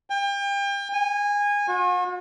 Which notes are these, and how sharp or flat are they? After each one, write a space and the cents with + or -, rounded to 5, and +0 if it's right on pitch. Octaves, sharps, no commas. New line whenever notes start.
G5 +35
G#5 -20
F#4 -45